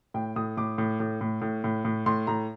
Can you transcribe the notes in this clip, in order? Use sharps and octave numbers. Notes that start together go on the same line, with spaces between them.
A2 G5
A2 D#6
A2 D6
A2
A2
A2
A2
A2
A2
A2 C6
A2 A#5